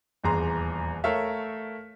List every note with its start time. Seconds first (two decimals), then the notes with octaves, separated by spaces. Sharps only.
0.24 D#1 E2 G#4 A#5 C6
1.04 A3 A#4 C#5 E5 F5